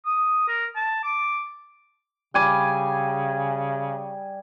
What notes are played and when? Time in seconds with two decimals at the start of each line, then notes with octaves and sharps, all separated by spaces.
0.06 D#6
0.48 A#4
0.76 A5
1.03 D6
2.34 C#3 G3 G#5 D6